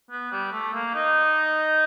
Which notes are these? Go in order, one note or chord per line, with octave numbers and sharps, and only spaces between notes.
B3
G3
A3
A#3
D#4